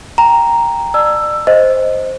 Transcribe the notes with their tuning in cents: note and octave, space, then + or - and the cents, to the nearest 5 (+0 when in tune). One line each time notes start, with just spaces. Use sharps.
G5 +10 A#5 +0
D5 +35 A5 +0 E6 +15
C5 +0 D#5 +0